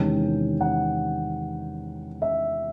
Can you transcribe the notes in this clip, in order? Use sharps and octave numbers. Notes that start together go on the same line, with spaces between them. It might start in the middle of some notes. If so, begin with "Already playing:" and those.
Already playing: E2 C3 D#3 G#3 C#4 G5
F#5
E5